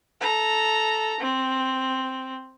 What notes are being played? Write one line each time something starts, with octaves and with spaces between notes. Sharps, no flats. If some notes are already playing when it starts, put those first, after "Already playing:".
A4 A#5
C4